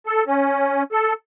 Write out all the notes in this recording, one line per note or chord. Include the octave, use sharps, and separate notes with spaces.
A4
C#4
A4